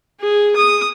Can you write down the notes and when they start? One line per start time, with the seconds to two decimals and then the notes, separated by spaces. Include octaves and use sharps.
0.21 G#4
0.56 D#6